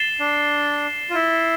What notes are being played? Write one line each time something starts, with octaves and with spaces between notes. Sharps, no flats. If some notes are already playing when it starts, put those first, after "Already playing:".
Already playing: A6 C7 E7 G7
D4
F4
E4